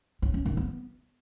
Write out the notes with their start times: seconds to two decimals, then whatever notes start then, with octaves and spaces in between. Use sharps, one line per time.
0.22 C#4
0.34 C#4
0.46 D#3
0.57 B3